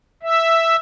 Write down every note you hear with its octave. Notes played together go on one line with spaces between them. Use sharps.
E5